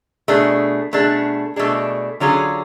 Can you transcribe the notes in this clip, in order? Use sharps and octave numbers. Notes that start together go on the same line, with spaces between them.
B2 A3 D4 G#4
B2 A3 D4 G#4
B2 A3 D4 G#4
D3 F#3 C#4 F4 G#4